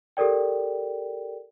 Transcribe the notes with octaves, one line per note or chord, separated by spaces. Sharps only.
G4 A4 A#4 D5 G5